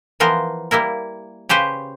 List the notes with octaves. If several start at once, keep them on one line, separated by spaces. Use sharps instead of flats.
E3 F3 B3 A#4 C5
G3 A#3 E4 A#4
C#3 G4 B4 C5